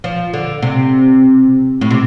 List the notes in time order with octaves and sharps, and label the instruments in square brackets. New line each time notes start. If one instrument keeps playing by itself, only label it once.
[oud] F3
D3
C3
A2
C3